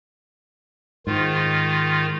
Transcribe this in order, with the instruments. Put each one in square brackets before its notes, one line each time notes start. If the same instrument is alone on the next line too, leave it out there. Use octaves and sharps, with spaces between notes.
[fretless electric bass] G#2 [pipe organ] D#3 F4